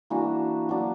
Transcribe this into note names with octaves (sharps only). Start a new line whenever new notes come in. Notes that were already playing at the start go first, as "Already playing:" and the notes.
E3 A#3 D4 F#4
F#3 A#3 D4